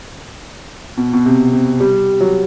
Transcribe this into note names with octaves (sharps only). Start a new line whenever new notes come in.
B2
B2
C3
C3
G3
F#3